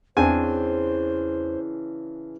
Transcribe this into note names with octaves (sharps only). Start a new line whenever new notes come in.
E2 C#3 E3 C4 D4 C5 G#5